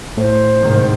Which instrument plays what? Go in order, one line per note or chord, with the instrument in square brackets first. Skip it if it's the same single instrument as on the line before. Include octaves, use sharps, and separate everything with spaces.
[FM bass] A2 [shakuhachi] C5
[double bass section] G#2 C3 D#3